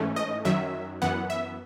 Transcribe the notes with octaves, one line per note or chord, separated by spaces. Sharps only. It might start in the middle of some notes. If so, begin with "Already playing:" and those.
Already playing: G#2 E3 A3 C#4
D#5
F#2 D#3 F#3 E5
F#2 E3 B3 F#5
E5